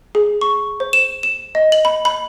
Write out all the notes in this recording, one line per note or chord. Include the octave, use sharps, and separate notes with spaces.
G#4
C#6
C5
E7
E7
D#5
F#7
B5
B5